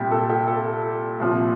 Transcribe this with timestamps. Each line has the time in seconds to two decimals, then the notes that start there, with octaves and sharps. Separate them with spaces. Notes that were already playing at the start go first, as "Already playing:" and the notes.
Already playing: C2 A#2 G3 G4
0.11 A4
0.30 G4
0.47 A4
1.20 C2 A#2 F3